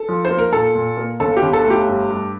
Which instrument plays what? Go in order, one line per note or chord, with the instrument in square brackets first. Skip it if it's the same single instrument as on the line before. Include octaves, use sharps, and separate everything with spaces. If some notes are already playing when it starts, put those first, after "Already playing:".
Already playing: [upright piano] A4
[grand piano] F3
[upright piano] C5
[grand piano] A#3
[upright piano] A#4
[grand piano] A#2 [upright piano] A4
[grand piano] A#2
A#3
[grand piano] G1 [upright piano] A4
[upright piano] G4
[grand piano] G1
[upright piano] A4
[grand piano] A3
[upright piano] G4
[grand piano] G2
G2